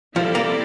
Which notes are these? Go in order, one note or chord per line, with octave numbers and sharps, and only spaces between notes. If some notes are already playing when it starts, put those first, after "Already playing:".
F3 G3 C4 E4 A4 D5
A#3